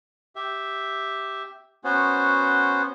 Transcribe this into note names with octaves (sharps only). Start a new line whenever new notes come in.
G4 E5
B3 C#4 F#4 C5